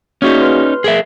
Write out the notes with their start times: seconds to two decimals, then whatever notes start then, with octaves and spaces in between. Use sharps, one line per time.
0.22 A#3 C#4 D#4 F#4 G#4
0.41 B4 C6 F6
0.84 G#4 A#4 E5